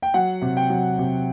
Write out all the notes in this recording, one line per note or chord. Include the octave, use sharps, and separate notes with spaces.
G5
F#3 F#5
C3
G5
F#3
C3